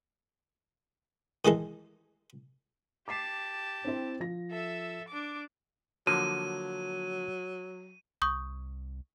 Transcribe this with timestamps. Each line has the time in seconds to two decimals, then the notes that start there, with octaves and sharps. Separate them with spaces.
1.45 D#3 E3 G#3 A4
3.08 G4 A5 D6 B6 C7
3.85 C4 E4 C5
4.20 F3 A#6
4.51 A4 E5
5.08 D4 D6
6.07 D3 F3 F#3 A#3 D#7
8.22 C2 C#6 D#6 G6